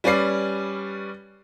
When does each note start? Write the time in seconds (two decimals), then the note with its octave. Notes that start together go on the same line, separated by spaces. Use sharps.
0.04 G3 C#4 B4 D5 C7